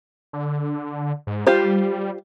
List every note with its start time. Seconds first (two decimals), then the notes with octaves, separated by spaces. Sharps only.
0.33 D3
1.27 G#2
1.47 G3 F4 G4 C5